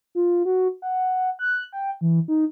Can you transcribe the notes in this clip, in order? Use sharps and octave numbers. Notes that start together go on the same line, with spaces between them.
F4
F#4
F#5
F#6
G5
E3
D#4